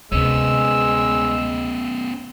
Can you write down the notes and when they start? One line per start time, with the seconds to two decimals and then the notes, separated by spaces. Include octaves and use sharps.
0.12 D2 C3 G#3 B3 C#4 E6